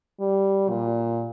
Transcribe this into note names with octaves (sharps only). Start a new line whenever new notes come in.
G3
A#2